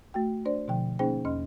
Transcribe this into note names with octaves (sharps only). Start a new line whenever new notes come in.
A3 F#4 G5
D4 C5 D5
B2 D3 F3 G5
A#3 C#4 D#4 G#4 C5 G5
E2 C#4 D#5 C6 F6